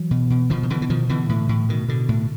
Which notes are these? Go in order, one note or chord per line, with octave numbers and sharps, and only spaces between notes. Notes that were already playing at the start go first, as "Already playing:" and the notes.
Already playing: E3 F#3
B2
B2
B2 D#3 F3
D#3
B2 D3 E3
E3
B2 D#3 F3
B2 D3 E3
A2
A2
B2 D#3
B2 D3
A2